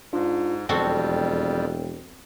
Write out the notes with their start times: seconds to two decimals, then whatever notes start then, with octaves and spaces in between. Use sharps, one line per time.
0.13 G#2 D4 F4
0.69 E1 F2 G3 C4 F#4 A4 G5